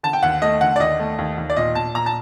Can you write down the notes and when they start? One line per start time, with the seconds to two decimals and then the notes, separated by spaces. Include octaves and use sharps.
0.03 D3 A5
0.13 G5
0.23 D#2 F#5
0.42 A3 D#5
0.61 D3 F#5
0.76 D5
0.80 D#2 D#5
0.99 A3
1.19 D#2
1.38 D#2
1.50 D5
1.56 A#2 D#5
1.75 A#2 A5
1.95 A#2 A#5
2.06 A5